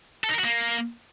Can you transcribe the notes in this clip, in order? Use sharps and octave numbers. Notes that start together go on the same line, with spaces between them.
A4
D#4
A#4
F#4
A#3